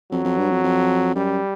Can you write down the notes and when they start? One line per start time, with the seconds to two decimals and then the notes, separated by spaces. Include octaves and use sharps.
0.12 F2 F#3
0.24 F2
0.38 G2
0.50 F2
0.64 F2
1.15 F#2 G3